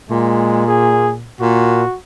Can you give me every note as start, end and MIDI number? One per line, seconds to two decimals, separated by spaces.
0.11 1.31 46
0.11 0.67 56
0.67 1.13 68
1.41 1.84 46
1.41 1.96 66